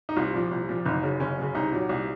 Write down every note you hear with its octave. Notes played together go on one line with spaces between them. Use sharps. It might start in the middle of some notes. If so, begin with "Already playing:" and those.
D#4
C2 F4
A#2 F3
C2
A#2 F3
F#1 D#4
F#2 C#3
F#1 C#4
F#2 C#3
C2 D#4
A#2 F#3
C2